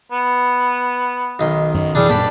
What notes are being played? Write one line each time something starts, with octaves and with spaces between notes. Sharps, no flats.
B3
B1 D#3 C6
F#2
C3 E3 G3 D4 G#4 D5
F#2 A#2 A#3 D4 A4 G5 B5